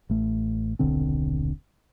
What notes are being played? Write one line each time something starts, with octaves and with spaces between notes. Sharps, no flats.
A1 A3
D#1 B1 D3 C4